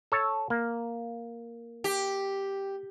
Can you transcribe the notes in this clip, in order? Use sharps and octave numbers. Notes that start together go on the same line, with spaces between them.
A4 C#5 A5
A#3
G4